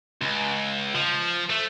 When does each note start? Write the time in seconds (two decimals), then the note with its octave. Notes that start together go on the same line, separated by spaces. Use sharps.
0.22 C#2
0.94 F3
1.50 A3